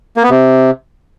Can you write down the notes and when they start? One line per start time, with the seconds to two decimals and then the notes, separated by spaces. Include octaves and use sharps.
0.17 A#3
0.23 B3
0.30 C3